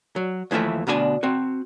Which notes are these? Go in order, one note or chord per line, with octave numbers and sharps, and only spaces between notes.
F#3
D#2 E3 F3 A3 E5
D2 B2 D4 E4 G#5
C4 F#4